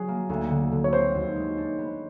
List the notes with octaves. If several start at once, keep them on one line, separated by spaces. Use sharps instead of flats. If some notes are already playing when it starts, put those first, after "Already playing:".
Already playing: D3 F#3 G#4
A#3
D2
D3
D3
C#5
C4 C5
D#2
G#3
D4
B3